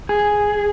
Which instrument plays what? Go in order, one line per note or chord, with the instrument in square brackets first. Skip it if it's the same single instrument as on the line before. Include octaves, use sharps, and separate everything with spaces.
[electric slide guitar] G#4